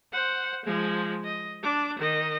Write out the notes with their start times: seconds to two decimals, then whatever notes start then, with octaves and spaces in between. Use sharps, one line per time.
0.12 C5 F#5
0.65 F3 G#3
1.24 D#5
1.63 D4 D6
1.99 D#3 D#5